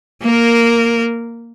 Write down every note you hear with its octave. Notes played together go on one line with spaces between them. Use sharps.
A#3 A#4